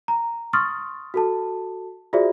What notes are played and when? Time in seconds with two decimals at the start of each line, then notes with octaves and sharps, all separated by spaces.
0.08 A#5
0.53 C6 C#6 D#6 F6 A6
1.14 F#4 A4 A5
2.13 F4 F#4 G#4 C5 D5 E5